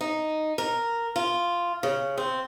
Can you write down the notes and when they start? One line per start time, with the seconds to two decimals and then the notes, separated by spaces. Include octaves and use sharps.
0.01 D#4
0.58 A#4
1.16 F4
1.83 C#3
2.18 C4